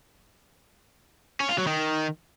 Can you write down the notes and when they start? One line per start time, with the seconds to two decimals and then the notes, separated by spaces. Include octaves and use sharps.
1.40 C#4
1.49 F4
1.58 F#3
1.67 D#3